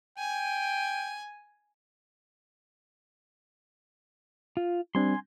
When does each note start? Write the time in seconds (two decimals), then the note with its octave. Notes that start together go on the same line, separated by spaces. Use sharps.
0.18 G5 G#5
4.57 F4
4.95 G3 C4 D4 G#5 C6